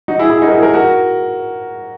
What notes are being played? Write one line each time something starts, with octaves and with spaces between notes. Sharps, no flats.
D#4 F#4
E4 G#4
E4 G#4
D#4 F#4
A#4
E4 G#4
F#4 A#4
F#4 A#4